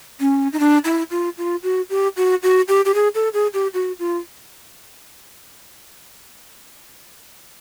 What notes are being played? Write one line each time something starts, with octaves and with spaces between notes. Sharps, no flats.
C#4
D#4
D4
E4
F4
F4
F#4
G4
F#4
F#4
G4
G4
G#4
A4
G#4
G4
F#4
F4